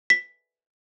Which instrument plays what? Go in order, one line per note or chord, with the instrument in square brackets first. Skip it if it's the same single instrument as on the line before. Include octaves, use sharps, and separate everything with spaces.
[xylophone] B6